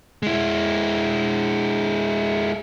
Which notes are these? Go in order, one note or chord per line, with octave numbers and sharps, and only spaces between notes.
G#3 E4